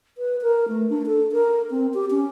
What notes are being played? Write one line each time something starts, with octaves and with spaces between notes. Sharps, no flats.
B4
A#4
A3
D4
A4
A#4
C4
G4
C#4